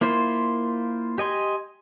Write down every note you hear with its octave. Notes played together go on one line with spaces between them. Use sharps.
A#3 E4 F4 C5
G4 D#5 G#5 C6